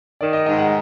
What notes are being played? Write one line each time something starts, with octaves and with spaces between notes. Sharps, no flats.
D#3 D5
D#5
G#2 D#5
F#5